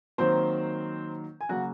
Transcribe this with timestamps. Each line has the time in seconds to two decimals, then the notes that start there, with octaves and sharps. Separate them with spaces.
0.18 D#3 F#3 A#3 C4 C5
1.41 G#5
1.49 C#3 F#3 A#3 F#4 F#5